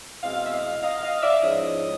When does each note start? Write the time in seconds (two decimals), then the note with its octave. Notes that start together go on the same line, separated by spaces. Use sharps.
0.23 B2 G#3 C4 E4 D#5 F5
0.46 E5
0.53 D#5 F5
0.83 D#5 F5
1.03 D#5 F5
1.22 D5 E5
1.42 G#2 F3 G#3 C#4 E4 C#5 D#5